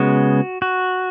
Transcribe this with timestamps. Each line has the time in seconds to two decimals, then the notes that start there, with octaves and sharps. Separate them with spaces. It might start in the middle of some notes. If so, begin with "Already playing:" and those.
Already playing: C#3 G#3 B3 F#4
0.62 F#4